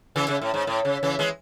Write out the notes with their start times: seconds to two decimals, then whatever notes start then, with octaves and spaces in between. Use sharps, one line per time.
0.16 C#3 E3
0.28 C#3
0.42 A2
0.54 G#2
0.67 A2
0.85 C#3
1.03 C#3 E3
1.19 E3 G#3